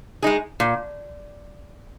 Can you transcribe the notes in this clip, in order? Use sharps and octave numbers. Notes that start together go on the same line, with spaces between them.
G#3 D#4 G#4
A#2